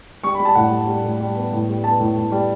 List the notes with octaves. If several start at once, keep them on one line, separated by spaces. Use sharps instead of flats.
G3 C#6
B5
G3
A5
A2 F#5
G3
G3
A2
G3
B3
A2
G3
B3 A5
A2
A2
G3